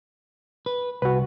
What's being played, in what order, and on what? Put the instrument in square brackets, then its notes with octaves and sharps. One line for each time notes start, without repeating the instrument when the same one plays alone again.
[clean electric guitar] B4
[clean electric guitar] C2 [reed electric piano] F#4 B4